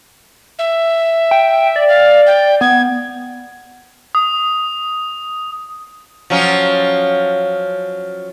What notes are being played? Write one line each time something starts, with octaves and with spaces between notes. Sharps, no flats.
E5
G5
D5
F5
G5
B3 G#6
D#6
F3 F#3 C#4